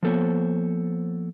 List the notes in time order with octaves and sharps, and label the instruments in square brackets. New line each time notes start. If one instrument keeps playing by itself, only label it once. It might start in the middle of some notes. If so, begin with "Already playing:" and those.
[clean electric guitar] F3 A#3 B3 A4 C5 C#5